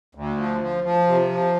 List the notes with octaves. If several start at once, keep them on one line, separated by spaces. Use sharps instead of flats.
D2
F3
F3
F3
C3
F3